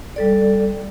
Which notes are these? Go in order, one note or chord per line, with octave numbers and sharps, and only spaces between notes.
G3 A4 D5